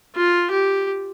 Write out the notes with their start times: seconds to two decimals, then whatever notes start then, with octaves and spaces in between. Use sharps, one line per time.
0.16 F4
0.51 G4